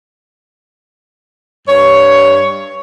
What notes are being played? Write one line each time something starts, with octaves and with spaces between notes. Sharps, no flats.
G2 C#5